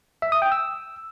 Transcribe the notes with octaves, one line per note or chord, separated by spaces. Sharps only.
E5
D#6
G5
E6